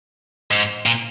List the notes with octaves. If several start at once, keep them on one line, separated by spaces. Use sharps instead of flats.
G#2
A#2